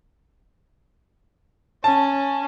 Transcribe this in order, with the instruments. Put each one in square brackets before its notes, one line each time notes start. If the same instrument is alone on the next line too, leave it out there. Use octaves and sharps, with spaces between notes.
[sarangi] C#4 [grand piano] A5